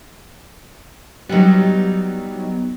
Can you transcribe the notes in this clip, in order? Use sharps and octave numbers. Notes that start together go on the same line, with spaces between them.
F#3 G3 B3 D#4